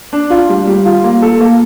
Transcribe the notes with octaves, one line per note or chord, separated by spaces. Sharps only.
D4
F4
G3
G3
F4
A#3
A4
A#3